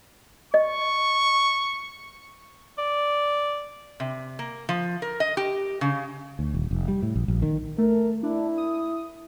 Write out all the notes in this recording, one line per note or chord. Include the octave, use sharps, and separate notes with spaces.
D#5 C#6
D5
C3
A#3
F3
A#4
D#5
G4
C#3
D2
D#1
F1
G3
A2
A#1
A#1
D#3
A3 A#4
D4 E4
D#6